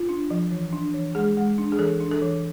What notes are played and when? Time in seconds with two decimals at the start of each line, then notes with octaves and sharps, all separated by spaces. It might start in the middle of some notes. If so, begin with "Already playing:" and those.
Already playing: F4
0.09 D4
0.30 F3
0.51 E3
0.73 D4
0.94 E3
1.15 G#3 G#4
1.37 G#3
1.58 D4
1.72 G#4
1.79 E3 A4
2.00 D4
2.11 A4
2.22 E3